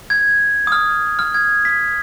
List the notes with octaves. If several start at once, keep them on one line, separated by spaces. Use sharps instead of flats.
G#6
D#6
F6
F6
G#6
B6